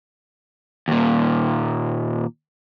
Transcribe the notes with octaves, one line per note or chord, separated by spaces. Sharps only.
D#2 A#2